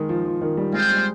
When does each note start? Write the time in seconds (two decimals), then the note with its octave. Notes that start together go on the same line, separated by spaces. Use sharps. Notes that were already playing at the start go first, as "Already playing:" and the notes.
Already playing: D#3 G#3
0.09 F3
0.25 F3
0.42 D#3
0.57 G3
0.73 G#3 C4 F4 C5 G5
0.90 G3
0.97 G#3